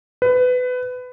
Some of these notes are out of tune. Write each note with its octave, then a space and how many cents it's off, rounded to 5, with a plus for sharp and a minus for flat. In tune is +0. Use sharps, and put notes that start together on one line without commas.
B4 +20